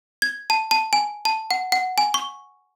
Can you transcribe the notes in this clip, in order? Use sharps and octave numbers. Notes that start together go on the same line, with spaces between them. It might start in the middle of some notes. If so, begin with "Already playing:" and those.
G#6
A5
A5
G#5
A5
F#5
F#5
G#5
C#6